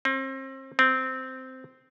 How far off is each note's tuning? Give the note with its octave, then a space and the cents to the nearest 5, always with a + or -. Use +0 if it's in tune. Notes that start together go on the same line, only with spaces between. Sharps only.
C4 +35
C4 -10